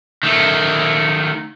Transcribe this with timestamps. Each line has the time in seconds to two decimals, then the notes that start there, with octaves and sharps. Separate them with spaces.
0.23 D#3 A3